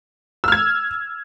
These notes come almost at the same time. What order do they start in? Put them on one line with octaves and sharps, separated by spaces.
E6 F6 G#6